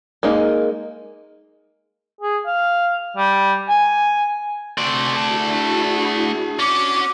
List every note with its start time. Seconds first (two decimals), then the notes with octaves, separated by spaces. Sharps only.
0.23 G#3 A#3 D#4
2.21 G#4
2.46 F5
3.17 G3
3.68 G#5
4.78 C3 A3 C4 F#4 D5 G#5
5.15 D4 E4 F#4 G#4 A5
6.59 C#4 D4 F#4 D6